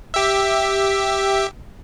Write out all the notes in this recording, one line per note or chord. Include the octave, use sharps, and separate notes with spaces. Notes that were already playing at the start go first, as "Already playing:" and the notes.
G4 E5